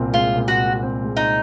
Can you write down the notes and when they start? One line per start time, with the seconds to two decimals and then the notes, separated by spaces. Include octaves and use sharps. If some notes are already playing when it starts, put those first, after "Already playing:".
Already playing: C2 A#2 C4
0.13 G#3 F4
0.36 A#2
0.48 F#4
0.59 C2
0.83 C4
1.04 G#3
1.17 D#4